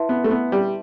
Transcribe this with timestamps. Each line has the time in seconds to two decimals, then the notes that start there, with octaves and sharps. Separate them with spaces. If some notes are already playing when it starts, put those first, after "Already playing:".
Already playing: E4 B4 E5 A5 C6
0.09 B3
0.24 A3
0.31 B3
0.52 G3